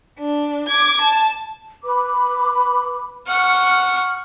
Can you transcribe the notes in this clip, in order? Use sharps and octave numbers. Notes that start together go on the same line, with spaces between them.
D4
D6 G#6
A5
B4 B5 D6
F#5 C#6 F6